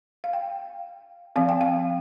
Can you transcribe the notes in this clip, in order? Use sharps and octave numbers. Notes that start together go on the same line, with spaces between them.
F5
G5
F3 C4 F5
G5
F5